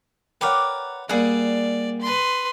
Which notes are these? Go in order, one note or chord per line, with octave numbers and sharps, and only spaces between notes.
A#4 B4 C#5 D5 F#5 G5
G3 A#3 G#4 D5 F#5
B4 C6